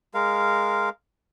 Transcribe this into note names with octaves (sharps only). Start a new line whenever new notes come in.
G#3 A#4 F5